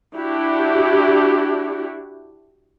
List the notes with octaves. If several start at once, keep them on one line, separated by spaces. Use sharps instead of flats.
D4 E4 F#4 G4